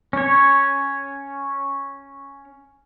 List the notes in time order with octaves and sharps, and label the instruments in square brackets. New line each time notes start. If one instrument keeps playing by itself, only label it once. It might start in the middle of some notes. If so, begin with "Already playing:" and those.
[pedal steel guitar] C#4 C#5